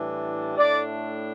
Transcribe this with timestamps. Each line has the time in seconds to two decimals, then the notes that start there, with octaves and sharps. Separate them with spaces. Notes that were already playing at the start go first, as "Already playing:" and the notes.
Already playing: A2 E3 G3 D4
0.57 A2 A3 D4 D5